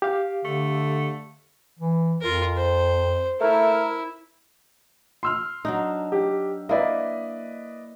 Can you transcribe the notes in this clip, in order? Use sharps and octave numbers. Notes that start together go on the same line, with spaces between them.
G4 F5
D3 A3
E3
F2 F4 A#4
C5
A3 E4 A#4
C6 E6 F6
F#3 D4 D#4
G4
A#3 E4 B4 D5 D#5